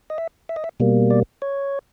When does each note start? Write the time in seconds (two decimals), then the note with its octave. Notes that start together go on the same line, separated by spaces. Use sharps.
0.10 D#5
0.18 E5
0.49 E5
0.56 D#5
0.64 E5
0.80 B2 G3 A#3
1.11 D5
1.42 C#5